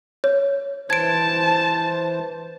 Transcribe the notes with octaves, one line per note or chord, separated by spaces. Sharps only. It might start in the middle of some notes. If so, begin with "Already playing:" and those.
C#5
E3 C5 A5 G#6 D7